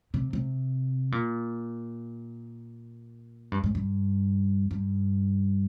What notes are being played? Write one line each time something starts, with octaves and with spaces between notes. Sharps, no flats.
C3
C3
A#2
G2
G#2
G2
G2